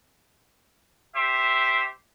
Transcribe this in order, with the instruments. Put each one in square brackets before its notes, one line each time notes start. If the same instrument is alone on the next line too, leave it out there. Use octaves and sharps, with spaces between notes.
[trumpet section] G4 C5 E5